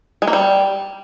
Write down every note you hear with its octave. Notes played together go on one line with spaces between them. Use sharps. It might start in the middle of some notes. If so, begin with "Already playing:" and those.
G#3
A#3
G3